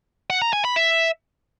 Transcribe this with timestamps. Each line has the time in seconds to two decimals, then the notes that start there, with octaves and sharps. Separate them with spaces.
0.30 F#5
0.42 A#5
0.53 G#5
0.65 B5
0.76 E5